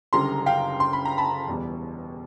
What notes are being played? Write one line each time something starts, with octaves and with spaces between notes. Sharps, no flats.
F#1 F#2 D3 G3 A#5 C6
F5 G5
C6
B5
A#5
A5 B5
E1 E2 B2 G3